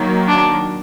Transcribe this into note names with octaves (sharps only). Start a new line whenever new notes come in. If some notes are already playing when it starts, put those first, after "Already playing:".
Already playing: D#3 F#3 A#3
D4